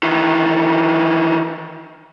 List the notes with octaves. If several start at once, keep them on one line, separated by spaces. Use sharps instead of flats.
D#3 E3